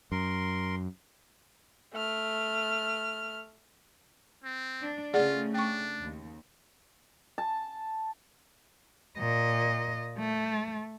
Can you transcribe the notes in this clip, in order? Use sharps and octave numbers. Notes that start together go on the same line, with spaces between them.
F#2 A#4 C6
A3 F6
C4
D4
C#3 A3 F4 G#4 D5 F#5
D4 G5 C#6
D#2
A5
A#2 D#5
A3